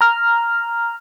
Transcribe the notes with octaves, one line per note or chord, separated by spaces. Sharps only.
A#5 F6